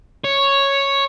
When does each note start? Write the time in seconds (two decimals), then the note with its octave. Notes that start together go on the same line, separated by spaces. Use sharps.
0.25 C#5